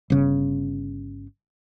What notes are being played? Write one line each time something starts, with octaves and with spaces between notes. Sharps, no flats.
G1 C#3